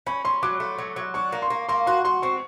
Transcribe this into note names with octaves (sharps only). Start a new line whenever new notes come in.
C#4 B5
C#4 C6
F#3 D6
A3
F#3
F#3
D4 C#6
A#3
C6
A#3
A#3 C6
F#4 C6
F#4 C6
C4 C#6